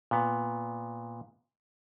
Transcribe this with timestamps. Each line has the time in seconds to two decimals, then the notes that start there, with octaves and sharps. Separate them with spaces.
0.11 A#2 B3